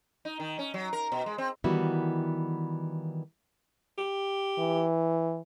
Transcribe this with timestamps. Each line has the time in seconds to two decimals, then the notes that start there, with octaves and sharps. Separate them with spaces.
0.25 D#4
0.40 D#3
0.59 C#4
0.74 F#3
0.93 A#4
1.12 B2
1.26 G#3
1.38 C4
1.64 D#3 E3 G3 B3 E4 F#4
3.98 G4
4.59 E3